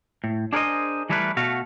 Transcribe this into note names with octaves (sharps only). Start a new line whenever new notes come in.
A2
D4 G#4 A#4 C5 D#5
E3 G3 A3 E4 A#4 B4
B2 A3 F#4 F5